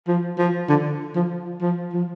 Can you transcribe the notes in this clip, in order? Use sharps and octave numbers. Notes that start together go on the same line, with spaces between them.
F3
F3
D3
F3
F3
F3